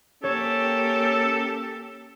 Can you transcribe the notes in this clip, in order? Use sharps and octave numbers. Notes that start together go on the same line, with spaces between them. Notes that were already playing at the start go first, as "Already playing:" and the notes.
A#3 C#4 G4 A4 C#5